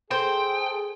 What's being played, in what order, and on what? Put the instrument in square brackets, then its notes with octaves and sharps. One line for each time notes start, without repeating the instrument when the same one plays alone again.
[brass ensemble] G#4 A4 [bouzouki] C5 [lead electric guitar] G5